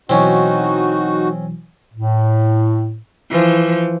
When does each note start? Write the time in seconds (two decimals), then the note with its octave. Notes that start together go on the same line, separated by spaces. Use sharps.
0.09 B2 E3 F#3 C4 C#4 D#4 F#4
1.94 A2
3.31 E3 F3